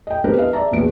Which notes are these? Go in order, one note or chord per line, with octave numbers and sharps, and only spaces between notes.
D#5 G5
B3 C4 D4 G4 A#4 B4
B4 D#5 F5
D5 E5 A5 A#5
E1 A#1 B3 D7